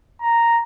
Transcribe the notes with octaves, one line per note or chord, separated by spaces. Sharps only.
A#5